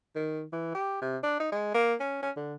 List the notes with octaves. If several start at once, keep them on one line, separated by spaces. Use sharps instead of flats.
D#3
E3
G4
C3
D4
D#4
G#3
A#3
C#4
C#4
D3